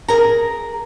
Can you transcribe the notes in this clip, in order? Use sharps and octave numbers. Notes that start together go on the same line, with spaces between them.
G#4 A#4 A#5